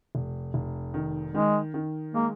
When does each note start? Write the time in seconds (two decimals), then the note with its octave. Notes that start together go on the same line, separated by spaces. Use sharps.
0.15 F1
0.54 F1
0.94 D#3
1.34 D#3 G#3
1.74 D#3
2.14 G#3 A#3